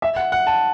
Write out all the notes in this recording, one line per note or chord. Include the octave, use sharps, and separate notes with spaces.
E5
F#5
F#5
A5